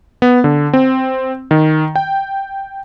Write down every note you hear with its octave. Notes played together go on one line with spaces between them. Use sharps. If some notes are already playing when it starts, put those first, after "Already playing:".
B3
D3
C4
D#3
G5